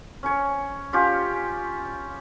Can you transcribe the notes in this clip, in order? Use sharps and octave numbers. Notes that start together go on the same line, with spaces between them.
C#4 C#5
C#4 F4 G4